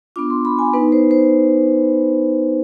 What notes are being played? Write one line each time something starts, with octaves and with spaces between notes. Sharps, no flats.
B3 D4 F4 D6
C6
B5
G#5
B3 D#4 B4
C5
C5